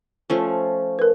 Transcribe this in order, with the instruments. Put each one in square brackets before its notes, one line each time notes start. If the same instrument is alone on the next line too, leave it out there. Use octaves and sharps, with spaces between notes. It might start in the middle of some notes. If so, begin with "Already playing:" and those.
[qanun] F3 A3 C#4
[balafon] A#4 B4